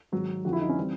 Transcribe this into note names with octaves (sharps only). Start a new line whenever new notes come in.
G#2 D#3 F#3
F2 D3 F3 F#4
E4
D#4
C#4
E3 G3 C4